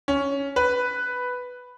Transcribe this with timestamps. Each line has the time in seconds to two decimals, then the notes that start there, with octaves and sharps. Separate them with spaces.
0.08 C#4
0.56 B4